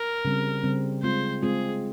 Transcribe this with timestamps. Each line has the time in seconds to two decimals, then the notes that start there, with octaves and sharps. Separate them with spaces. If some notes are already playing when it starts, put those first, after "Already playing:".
Already playing: A#4
0.25 C#3 G3 C4
0.63 C#3 G3 C4
1.03 G#3 C4 F4 C5
1.43 G#3 C4 F4 G#4